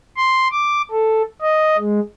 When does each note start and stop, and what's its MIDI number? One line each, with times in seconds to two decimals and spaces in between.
0.17 0.48 84
0.52 0.82 86
0.91 1.22 69
1.42 1.77 75
1.78 2.00 56